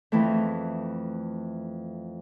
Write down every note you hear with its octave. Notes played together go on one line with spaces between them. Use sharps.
F2 E3 A3